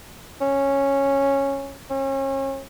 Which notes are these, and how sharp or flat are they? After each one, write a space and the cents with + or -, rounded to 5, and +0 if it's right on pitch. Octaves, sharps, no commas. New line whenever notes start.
C#4 -10
C#4 -35